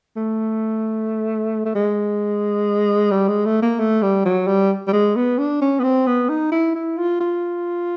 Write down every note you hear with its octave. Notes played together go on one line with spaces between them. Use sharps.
A3
A3
G#3
G3
G#3
A3
A#3
A3
G3
F#3
G3
G3
G#3
B3
D4
C#4
B3
C4
B3
D#4
E4
E4
F4
F4